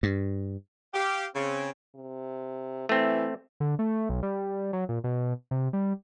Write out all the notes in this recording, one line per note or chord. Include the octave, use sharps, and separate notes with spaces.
G2
G4 F5
C#3 C4
C3
E3 A3 C4
D3
A3
B1
G3
F#3
A#2
B2
C3
G3